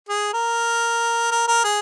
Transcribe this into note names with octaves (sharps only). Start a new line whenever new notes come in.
G#4
A#4
A#4
A#4
G#4